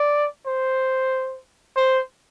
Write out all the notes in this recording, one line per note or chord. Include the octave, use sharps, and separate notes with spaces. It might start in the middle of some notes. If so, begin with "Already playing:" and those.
Already playing: D5
C5
C5